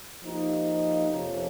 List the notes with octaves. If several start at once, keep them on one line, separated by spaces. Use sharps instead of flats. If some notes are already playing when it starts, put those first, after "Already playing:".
F3 A#3 D#4 G4
F2 C3 F3 A#3 C#4